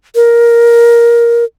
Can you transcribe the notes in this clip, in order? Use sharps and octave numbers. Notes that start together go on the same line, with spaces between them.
A#4